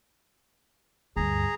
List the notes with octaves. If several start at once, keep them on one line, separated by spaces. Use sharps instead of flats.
D2 G2 G#4 A#5